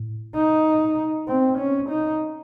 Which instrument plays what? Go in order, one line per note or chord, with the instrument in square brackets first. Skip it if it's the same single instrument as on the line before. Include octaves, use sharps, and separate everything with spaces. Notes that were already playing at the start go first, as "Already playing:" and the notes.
Already playing: [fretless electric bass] A2
[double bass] D#4
C4
C#4
D#4